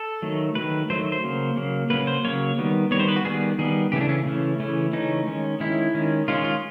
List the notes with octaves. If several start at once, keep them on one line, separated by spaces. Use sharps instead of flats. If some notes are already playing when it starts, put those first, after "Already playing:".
Already playing: A4
D#3 F#3 A3
D#3 F#3 A3 B4
D#3 F#3 A3 C5
C5
C#3 F#3 A#3
C#3 F#3 A#3
C#3 F#3 A#3 B4
C5
C#3 F#3 A#3 C#5
D#3 G3 B3
D#3 G3 B3 C#5
C5
B4
F#4
D#3 G3 B3 G#4
D#3 G3 B3 G#4
C#3 E3 A3 C#4 G4
D4
C#4
C#3 E3 A3 C#4
C#3 E3 A3 C#4
C#3 E3 A3 C#4 D#4
D#3 G#3 C#4
D#3 G#3 C#4 E4
D#3 G#3 C#4
D#3 G#3 C#4 F4
F4